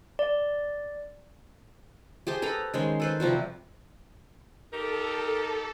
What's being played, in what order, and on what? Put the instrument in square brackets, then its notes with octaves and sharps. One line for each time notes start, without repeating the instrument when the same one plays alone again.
[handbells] D5
[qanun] G4 G#4 C5 A5
A4 B4 A#5 B5
D#3 G#3 C#4 C5
A4 B4 C5
C3 F3 G3 F#4
[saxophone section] D#4 G4 A#4 [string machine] A4